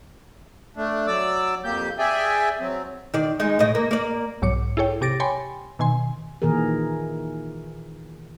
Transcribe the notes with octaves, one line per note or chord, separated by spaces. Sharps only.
A3 D4
F#3 D5 D6 E6
F2 A#3 G4 G6
G#4 D5 E5 G5 G#5
F#3 C4
D#3 D5
G#3 D#4
A2 C#3 D#5
A#3
A#3 D5
B1 G#2 F#3 C#5 D6 C#7
E4 G#4 A4 C#5 G5
C3 G4 D6 A6 A#6 D7
C#5 G5 G#5 B5 C6
B2 D#3 G#5 C6
A#2 D#3 E3 G#4 A#4